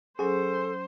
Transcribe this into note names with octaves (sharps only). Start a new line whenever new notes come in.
F#3 C#4 G#4 A4 C5